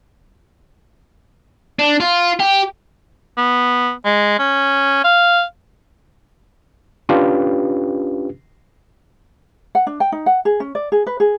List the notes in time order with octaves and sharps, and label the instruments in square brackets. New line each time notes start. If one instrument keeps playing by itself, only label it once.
[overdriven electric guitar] D4
F4
G4
[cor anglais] B3
G#3
C#4
F5
[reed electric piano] C#4 D4 F4 G4 B4
[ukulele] F#5
D4
G5
D#4
F#5
G#4
C#4
D5
G#4
B4
G#4